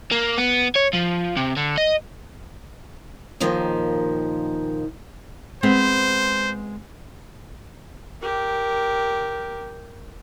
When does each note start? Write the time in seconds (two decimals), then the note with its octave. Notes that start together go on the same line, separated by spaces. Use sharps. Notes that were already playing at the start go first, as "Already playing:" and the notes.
0.12 A#3
0.38 B3
0.76 C#5
0.94 F3
1.37 C3
1.57 D3
1.78 D#5
3.40 D#2 A#2 D#3 F3
5.63 G#3 B3 C4 C5
8.21 G4 A#4